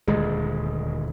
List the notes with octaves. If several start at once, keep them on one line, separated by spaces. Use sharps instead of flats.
D#1 D2 G#3